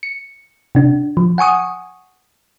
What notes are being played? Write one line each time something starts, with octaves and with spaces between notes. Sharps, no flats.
C#7
C3 D4
F3
F#5 G#5 C#6 D#6